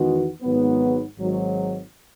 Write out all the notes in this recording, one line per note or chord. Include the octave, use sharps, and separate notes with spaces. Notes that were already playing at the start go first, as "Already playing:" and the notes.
Already playing: E2 D#3 G#3 B3 F#4
G#1 G#2 F#3 B3
G#1 G#2 F#3